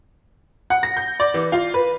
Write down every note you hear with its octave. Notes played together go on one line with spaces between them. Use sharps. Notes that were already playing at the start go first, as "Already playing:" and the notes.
F#5
A#6
G6
D5
E3
F4
B4